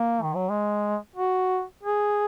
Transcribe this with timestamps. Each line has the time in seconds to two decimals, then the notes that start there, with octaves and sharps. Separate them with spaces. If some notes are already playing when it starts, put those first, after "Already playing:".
Already playing: A#3
0.22 D#3
0.35 F#3
0.50 G#3
1.16 F#4
1.84 G#4